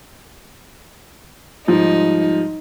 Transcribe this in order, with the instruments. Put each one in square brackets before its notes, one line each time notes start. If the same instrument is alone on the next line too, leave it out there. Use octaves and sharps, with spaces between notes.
[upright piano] G#2 F3 G3 [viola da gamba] D#4